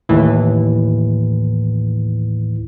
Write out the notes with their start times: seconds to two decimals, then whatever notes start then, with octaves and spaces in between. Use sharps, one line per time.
0.09 D#2 A2 E3